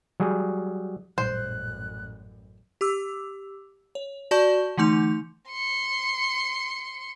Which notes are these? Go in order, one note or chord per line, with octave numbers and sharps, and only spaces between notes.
F#3 G3 G#4
A1 F#2 A#2 F#3 G3 C5 F#6
G4 D6 E6
C#5
F#4 D5 A5 C#6 G6 G7
D3 E3 A3 D#4 C6 F7
C6 C#7